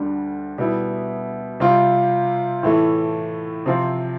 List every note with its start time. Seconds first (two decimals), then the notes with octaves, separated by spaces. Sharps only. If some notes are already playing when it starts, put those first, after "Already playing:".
Already playing: D2 D3 G3 D4
0.58 B2 G3 B3 E4
1.60 C3 G3 C4 F4
2.63 A2 E3 A3
3.66 C3 F3 C4